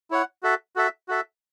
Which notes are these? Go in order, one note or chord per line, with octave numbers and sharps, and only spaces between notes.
E4 C#5 F#5
F#4 A4 E5
F#4 A4 E5
F#4 A4 E5